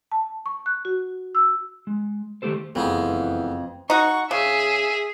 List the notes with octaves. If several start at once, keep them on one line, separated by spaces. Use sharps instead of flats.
A5
C#6
F#6
F#4
E6
G#3
D#3 A3 D#4 G4 A4 C5
F#1 F2 E3 A3 B3 G#4
D#4 F#4 C#6
C#3 G#4 E5